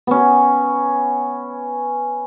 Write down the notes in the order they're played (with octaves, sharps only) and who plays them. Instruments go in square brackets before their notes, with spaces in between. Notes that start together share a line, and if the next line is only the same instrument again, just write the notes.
[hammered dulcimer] B3 C#4